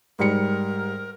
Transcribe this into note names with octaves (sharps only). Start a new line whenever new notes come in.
G#2 G3 A#4 C#7